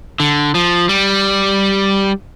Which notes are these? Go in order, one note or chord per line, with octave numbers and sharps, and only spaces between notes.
D3
F3
G3